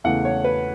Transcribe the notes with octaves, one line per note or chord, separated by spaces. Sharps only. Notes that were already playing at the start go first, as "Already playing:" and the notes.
E2 C#3 E3 A3 F#5
C#5
B4